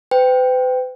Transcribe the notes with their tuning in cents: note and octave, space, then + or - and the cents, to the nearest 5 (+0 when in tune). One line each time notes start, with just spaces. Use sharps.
B4 +45 G5 +0